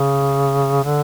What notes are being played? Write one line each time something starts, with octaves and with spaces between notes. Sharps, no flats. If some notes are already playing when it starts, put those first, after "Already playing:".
Already playing: C#3
D3